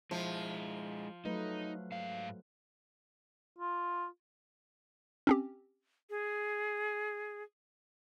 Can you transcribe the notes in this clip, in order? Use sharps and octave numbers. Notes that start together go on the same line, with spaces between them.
F3 G#3 E4
F#3 A3 D#4 B4
G#2 F5
F4
C4 C#4 G4
G#4